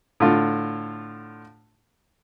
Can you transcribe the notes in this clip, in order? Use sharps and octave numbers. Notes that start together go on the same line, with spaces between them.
A2 D3 F4